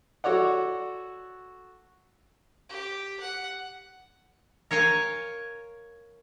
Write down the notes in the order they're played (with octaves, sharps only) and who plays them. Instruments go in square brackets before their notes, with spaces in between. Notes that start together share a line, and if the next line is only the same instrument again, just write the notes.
[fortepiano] F#4 A4 C#5 D5 F#5
[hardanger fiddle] G4
F#5
[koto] A#4 C#5 F5 G#5